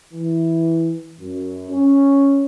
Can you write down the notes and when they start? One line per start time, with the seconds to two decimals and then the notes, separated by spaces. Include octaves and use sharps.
0.13 E3
1.20 F#2
1.69 C#4